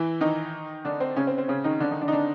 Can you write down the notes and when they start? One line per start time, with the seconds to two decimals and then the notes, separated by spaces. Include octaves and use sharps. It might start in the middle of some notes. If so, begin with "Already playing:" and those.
Already playing: E3 E4
0.21 D#3 D#4
0.85 D3 D4
1.00 C4
1.16 C#3 C#4
1.27 C4
1.38 C4
1.48 C#3 C#4
1.64 D#3 D#4
1.80 D3 D4
1.91 D#3 D#4
2.01 D3 D4
2.08 D#4
2.12 D3 D4